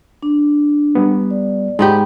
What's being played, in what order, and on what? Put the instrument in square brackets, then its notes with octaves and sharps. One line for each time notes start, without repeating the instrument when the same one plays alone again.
[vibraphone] D4
[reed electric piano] G3 B3
[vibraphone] D5
[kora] G#2 B3 G4 [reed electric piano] G#3